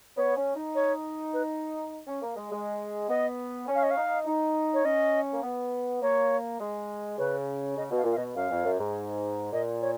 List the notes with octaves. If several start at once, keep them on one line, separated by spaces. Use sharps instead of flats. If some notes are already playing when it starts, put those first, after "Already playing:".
B3 C#5
C#4
D#4
C#5
B4
C#4
A#3
G#3
G#3
B3 D#5
C#4
F5
D#5
F5
D#4
D#4
C#5
C#4 D#5
A#3
B3
A#3 C#5
G#3
C#3 B4
C#3 D#5
B2
F5
A#2
F5
B2 D#5
F#2 F5
F2
F#2
G#2
A#2 D#5
C#5